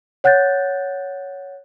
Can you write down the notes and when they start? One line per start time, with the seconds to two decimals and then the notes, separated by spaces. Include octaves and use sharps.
0.24 C#5 F#5 F#6 G6 A6